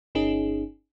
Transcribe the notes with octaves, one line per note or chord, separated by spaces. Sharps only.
G1 C#4 D#4 G#4